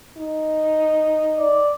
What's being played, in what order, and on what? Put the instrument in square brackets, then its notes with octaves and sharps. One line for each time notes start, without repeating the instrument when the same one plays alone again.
[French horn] D#4
[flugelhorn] D5